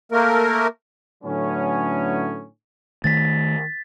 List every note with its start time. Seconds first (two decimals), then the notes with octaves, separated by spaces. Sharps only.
0.12 A3 A#3 A#4
1.24 A2 D3 F#3 A3 B3 C#4
3.04 D#3 A3 A6 B6